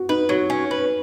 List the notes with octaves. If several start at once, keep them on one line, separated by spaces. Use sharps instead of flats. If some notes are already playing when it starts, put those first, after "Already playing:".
Already playing: F#4
D#4 B4
F#3 F#4
C#4
B4